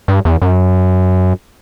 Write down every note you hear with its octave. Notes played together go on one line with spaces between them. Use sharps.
G2
E2
F#2